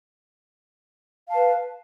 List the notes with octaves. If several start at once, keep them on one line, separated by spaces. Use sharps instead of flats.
B4 F5 A5